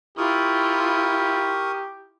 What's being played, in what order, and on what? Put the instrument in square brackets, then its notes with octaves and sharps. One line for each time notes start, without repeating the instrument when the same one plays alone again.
[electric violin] E4 F4 [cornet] G4 [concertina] A#4 C#6 D#6